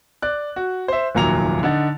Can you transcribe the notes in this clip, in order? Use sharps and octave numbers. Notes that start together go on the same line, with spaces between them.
D5 F#6
F#4
C5 E5
F1 D#2 A#2 F#3 A#5 F7
D3 D#4 F#5 A6